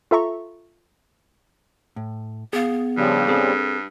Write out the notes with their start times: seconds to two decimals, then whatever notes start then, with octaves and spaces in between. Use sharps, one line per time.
0.11 F4 A4 E5 A#5 C#6
1.96 A2
2.53 B3 G#4 F5
2.97 G2 C#3 F3 G3
3.28 C4 G#4 A4